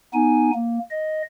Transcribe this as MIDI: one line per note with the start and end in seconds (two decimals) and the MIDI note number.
0.14 0.51 59
0.14 0.51 63
0.14 0.51 80
0.55 0.79 58
0.90 1.22 75